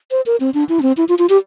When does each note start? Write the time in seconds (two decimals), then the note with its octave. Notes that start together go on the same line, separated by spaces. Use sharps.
0.11 C5
0.26 A#4
0.40 C4
0.54 D4
0.69 E4
0.79 D4
0.82 C4
0.97 E4
1.09 F4
1.19 F4
1.29 G4